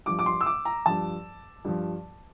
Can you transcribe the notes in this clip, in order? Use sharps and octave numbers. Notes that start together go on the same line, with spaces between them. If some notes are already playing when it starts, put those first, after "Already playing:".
G2 F3 D6
D6
C6
E6
D6
A#5
G2 F3 A5
G2 F3